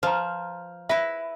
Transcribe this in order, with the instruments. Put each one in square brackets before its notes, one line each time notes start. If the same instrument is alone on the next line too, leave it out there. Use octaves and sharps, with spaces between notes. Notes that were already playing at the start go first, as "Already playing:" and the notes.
[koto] F3 [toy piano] B4 A#5
[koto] E4 B4 [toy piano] E5